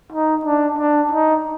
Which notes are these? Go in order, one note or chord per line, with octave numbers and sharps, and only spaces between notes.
D#4
D4
D4
D#4